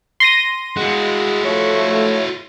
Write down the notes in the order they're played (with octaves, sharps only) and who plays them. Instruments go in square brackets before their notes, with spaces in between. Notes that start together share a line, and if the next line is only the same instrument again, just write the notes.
[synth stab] C6 A#6 D#7
[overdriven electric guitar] G#3 [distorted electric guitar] E4 F#4
[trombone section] F3 A3 [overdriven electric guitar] C#5